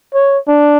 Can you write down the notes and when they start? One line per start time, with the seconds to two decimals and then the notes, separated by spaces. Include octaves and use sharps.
0.14 C#5
0.48 D4